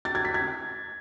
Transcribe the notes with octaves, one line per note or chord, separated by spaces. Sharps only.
A6
G#6
B6
G#6